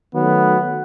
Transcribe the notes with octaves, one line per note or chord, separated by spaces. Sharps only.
D#3 F#3 A3 B3